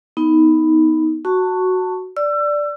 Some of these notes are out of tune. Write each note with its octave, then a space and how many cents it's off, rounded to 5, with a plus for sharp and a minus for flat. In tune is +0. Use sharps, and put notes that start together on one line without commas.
B3 +5 D#4 +20
F#4 +0 A5 +20 C#6 +0
D5 +0 E6 +30